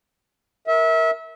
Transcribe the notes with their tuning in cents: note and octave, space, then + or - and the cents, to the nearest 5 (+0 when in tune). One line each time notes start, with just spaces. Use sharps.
A#4 +0 E5 -25